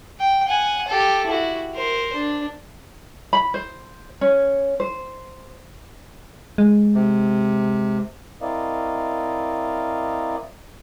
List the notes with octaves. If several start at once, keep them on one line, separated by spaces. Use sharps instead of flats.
G5
F#5 G#5
G4 A4
E4 F#4
A#4 C5
D4
B5
C5
C#4
C5
G#3
C3
C4 E4 A#4 D5 D#5 F5